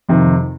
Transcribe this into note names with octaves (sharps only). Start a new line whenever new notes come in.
F2 C3 D#3